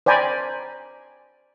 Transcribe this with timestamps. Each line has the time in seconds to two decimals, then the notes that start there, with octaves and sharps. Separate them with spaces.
0.06 C5 D5 G5 G#5 A#5 B5